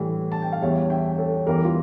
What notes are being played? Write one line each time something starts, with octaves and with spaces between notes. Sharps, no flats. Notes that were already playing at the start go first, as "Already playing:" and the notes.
Already playing: A2 E3 G3
A5
G5
F5
E2 E3 G3 C#5 E5
E5 G5
A4 C#5
E2 E3 G3 G4 A#4
F4